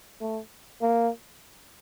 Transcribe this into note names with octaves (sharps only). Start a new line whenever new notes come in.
A3
A#3